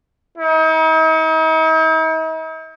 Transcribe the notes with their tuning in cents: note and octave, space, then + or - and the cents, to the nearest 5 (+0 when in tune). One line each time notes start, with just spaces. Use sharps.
D#4 +45